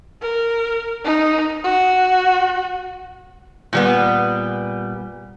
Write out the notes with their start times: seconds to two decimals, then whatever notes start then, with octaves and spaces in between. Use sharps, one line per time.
0.22 A#4
1.04 D#4
1.64 F#4
3.73 A#2 G3 B3